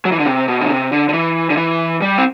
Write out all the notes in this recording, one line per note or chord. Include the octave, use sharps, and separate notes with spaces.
F#3
E3
D3
C3
B2
D3
C3
D3
D3
E3
D3
E3
G3
C4